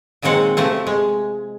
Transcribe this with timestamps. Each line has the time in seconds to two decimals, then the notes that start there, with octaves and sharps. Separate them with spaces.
0.22 A#2 D#3 F#3 G#3 C4 F#5
0.57 C3 F3 A3 C4
0.87 G#3